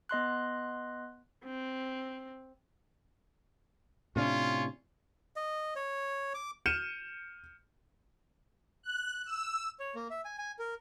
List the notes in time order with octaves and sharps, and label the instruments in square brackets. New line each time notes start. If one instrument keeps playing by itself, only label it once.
[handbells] B3 D#5 C6 F#6
[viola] C4
[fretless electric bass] A2 C3 D4 [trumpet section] C#4 F4
[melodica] D#5
C#5
D6
[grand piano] F6 G6 C#7 D#7 E7
[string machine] F#6
E6
[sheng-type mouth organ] C#5
A#3
E5
G#5
G#5
A#4